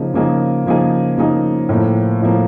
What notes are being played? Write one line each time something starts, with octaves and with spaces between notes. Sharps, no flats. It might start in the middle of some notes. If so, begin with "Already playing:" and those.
Already playing: C#3 F3 A#3 D#4 G#4
C#3 F3 A#3 D#4 G#4
C#3 F3 A#3 D#4 G#4
C#3 F3 A#3 D#4 G#4
A2 F3 A#3
A2 F3 A#3